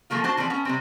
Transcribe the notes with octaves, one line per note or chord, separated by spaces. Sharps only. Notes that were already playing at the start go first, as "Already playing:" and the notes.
E3 F3 A3 A#3 F4
D4 F#4 C5 A5
E3 F3 C4 A4 D5
B3 C#4 A5
C3 G3 C4